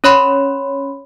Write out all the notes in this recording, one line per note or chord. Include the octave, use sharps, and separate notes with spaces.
C#4 C#5 B5 C6